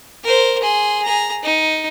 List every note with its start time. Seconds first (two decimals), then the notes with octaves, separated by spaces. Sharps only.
0.24 A#4 C5
0.63 G#4 C6
1.04 G#4 A#5
1.43 D#4